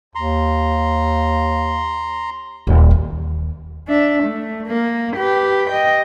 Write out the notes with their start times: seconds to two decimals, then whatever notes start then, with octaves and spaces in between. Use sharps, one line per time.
0.15 D#2 A#5 C6
2.67 D#1
2.91 D#2
3.88 D4 E5
4.24 A3
4.67 A#3
5.16 G4 B4
5.70 D#5 G5